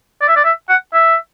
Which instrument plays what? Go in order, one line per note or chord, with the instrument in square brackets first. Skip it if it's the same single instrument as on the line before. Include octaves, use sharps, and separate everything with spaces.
[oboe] D5
E5
D5
E5
F#5
E5